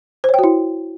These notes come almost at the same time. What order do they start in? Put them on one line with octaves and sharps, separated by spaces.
C5 C#5 G5 F#4 E4